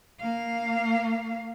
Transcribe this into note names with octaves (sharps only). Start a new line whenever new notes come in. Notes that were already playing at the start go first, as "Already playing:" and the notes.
A#3 F5